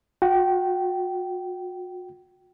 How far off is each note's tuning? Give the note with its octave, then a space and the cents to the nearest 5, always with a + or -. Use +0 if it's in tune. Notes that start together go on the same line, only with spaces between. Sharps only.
F#4 -40 G5 -20